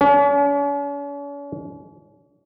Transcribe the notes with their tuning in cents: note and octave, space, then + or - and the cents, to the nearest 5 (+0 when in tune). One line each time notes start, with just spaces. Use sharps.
C#4 +45